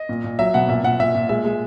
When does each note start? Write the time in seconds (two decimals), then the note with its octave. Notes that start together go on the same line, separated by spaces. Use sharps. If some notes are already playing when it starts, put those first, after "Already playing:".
Already playing: D#5
0.09 A#2
0.24 A#2
0.39 F#3 E5
0.54 B2 F#5
0.68 A#2 E5
0.84 A#2 F#5
1.00 A#2 E5
1.15 A#2
1.29 G#3 E5
1.45 G#3